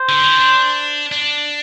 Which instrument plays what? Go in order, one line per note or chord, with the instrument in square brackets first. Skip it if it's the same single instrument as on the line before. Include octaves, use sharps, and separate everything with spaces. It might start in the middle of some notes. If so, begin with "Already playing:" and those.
Already playing: [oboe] C5
[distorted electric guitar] D3
E3
D4
D4